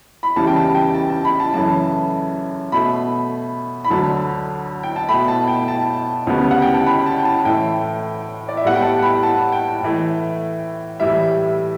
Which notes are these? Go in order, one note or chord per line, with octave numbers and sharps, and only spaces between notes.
B5
E2 C#3 E3 G3 A5
G5
A5
G5
A5
A5
B5
A5
F#2 C#3 E3 A3 A5
B2 A3 B5
B5
D2 D3 F#3 A5
G5
A5
B2 A3 B5
A5
G5
A5
D2 C#3 G3 B3
F#5
G5
A5
B5
A5
G5
A5
A2 E3 A3 G5
D5
E5
A2 G3 B3 F#5
G5
A5
B5
A5
G5
A2 E3 A3
A2 E3 G3 E5